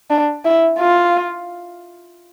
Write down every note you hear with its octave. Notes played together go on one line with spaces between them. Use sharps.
D4
E4
F4